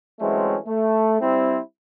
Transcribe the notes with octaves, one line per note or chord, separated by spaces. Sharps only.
E3 F#3 G#3 A3 C4 C#4
A3
G3 C4 E4